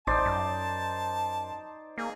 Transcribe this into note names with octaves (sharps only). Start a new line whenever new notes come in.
A1 D#4 C5 D5 A5
F#2
A#3 G#4